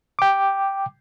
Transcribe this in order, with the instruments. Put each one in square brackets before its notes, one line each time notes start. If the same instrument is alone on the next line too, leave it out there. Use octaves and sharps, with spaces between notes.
[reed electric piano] G5 D6